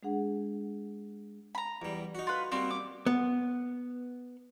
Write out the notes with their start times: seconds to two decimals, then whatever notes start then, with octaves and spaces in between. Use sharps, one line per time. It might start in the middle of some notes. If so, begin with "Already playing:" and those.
0.03 G#3 D4 G#4 F#5
1.55 A#5 B5
1.82 E2 G3
2.15 D#4 F#4
2.27 F4 B4
2.52 G3 A#3 C4 F#4
2.71 D6
3.06 B3